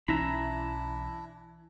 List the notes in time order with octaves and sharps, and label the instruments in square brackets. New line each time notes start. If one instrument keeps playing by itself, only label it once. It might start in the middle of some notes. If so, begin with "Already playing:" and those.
[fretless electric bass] B1 C#4 [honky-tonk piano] E3 [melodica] D4 E4 [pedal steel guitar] E5 A#5 B5